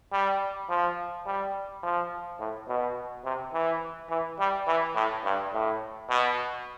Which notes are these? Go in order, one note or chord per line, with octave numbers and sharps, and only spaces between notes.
G3
F3
G3
F3
A2
B2
C3
E3
E3
G3
E3
A2
G2
A2
B2